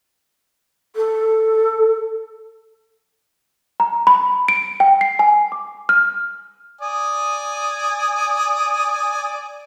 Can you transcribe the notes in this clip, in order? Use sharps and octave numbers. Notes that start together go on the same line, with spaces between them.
A4
A#5
B5
D7
G5
C7
G#5
D6
F6
D5 G#5 D#6